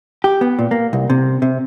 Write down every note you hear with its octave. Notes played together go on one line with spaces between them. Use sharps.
G4
B3
A#2
A#3
C2
C3
C3